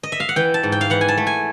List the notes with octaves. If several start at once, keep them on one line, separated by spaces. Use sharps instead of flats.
D#5
E5
F5
F#5
E3 G5
A5
G#2
G5
F5
E3 F#5
G#5
A5
A3
G#5